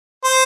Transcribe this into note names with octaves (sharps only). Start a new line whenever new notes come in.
C5